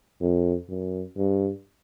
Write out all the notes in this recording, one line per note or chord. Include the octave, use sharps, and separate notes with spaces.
F2
F#2
G2